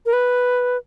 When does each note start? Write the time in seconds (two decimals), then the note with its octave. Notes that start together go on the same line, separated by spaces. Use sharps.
0.06 A#4
0.13 B4